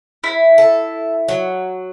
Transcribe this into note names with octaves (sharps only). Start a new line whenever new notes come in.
E4
A4
F#3